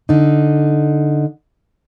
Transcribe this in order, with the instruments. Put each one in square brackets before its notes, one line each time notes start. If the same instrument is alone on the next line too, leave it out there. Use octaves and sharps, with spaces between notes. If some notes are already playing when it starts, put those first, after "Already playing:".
[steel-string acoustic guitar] D3 D#4